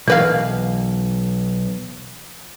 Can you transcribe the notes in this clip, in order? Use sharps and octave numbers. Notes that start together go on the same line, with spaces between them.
B1 E3 A#4 B4 F5 G#6